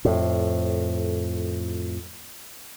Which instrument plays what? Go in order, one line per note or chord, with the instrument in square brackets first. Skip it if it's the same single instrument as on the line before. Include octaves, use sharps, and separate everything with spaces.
[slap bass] F2 A2